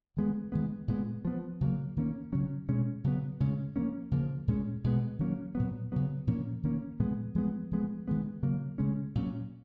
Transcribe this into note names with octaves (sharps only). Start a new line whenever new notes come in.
D#3 G#3 B3
D#3 G#3 B3
A#2 G#3 B3
F3 B3
C#3 F#3 A#3
D#3 A#3 C#4
C#3 F#3 C#4
B2 G#3 C#4
C#3 F#3 B3
C#3 G#3 C#4
F3 A#3 C#4
C#3 F3 A#3
A#2 G#3 C#4
B2 G#3 B3
D#3 F#3 A#3 C#4
A#2 F#3 B3
C#3 F#3 B3
A#2 F3 A#3 C#4
D#3 A#3 C#4
A#2 F3 G#3 B3
F3 G#3 B3
F3 G#3 B3
D#3 G#3 B3
C#3 F#3 A#3
C#3 G#3 C#4
A#2 F#3 C#4